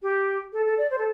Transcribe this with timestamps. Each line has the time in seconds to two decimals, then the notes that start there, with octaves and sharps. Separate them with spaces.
0.02 G4
0.53 A4
0.65 A4
0.78 D5
0.90 C5
0.98 A4